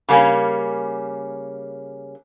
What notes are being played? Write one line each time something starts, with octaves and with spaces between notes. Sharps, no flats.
C#3 G3 A#3 C#4